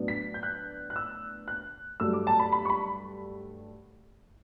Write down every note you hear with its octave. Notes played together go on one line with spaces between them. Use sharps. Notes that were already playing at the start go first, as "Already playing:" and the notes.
Already playing: A2 F#3 B3 D4
B6
G6
F#6
F#6
E6
F#6
G2 F#3 A3 E6
D6
A5
B5
B5
C#6
B5